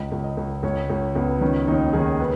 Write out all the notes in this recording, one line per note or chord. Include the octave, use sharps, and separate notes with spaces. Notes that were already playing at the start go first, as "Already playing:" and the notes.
Already playing: C#2 D#5
C#2
D#5
C#2
C#2 C#5
C#2 C#4
C#2 B3
D#3 C#4
D#2 D#4
D#3 G#4
C#3 B4